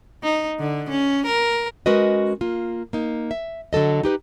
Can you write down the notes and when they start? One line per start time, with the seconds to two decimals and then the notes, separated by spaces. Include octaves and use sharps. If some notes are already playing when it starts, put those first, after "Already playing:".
0.23 D#4
0.60 D3
0.90 C#4
1.26 A#4
1.86 G#3 C#4 F#4 A#4 B4 D#5
2.41 A#3 F4
2.93 A#3 D#4
3.31 E5
3.73 D3 F#3 A4 D#5
4.03 D#4 G4 B4